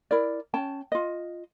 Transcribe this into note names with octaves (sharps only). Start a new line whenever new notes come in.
E4 A#4 D5
C#4 G5 A5
F4 D#5